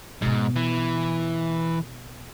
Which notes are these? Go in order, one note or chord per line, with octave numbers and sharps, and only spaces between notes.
G#2 B2 B3
E3